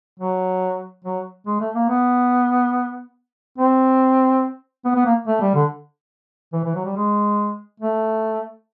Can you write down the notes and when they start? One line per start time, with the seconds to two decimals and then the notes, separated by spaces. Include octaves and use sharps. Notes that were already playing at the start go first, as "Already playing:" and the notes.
0.19 F#3
1.04 F#3
1.46 G#3
1.60 A3
1.75 A#3
1.89 B3
3.58 C4
4.85 B3
4.95 B3
5.05 A#3
5.27 A3
5.41 G3
5.55 D3
6.53 E3
6.65 E3
6.75 F#3
6.85 G3
6.96 G#3
7.80 A3